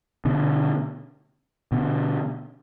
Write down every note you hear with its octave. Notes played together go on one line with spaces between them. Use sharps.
B2 D3
B2 D3